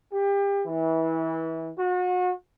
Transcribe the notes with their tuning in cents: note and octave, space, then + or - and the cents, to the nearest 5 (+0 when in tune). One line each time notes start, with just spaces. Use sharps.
G4 +30
E3 -25
F#4 -35